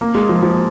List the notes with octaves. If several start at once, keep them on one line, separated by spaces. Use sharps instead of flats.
A#3
G#3
F3
F3